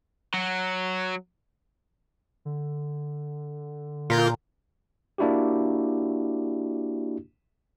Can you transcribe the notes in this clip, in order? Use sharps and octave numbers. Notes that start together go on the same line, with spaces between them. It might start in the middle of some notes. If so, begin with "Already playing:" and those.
F#3
D3
A#2 F4 A#4 G6
A#3 D4 E4 F#4 G4